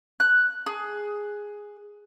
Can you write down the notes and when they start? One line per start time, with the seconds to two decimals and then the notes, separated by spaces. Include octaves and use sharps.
0.20 F#6
0.66 G#4